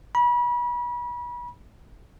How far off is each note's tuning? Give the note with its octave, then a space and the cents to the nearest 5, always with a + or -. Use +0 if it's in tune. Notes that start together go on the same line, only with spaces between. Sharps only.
B5 -35